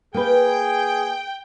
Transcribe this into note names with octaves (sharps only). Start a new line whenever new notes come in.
A#3 G#4 B4 G5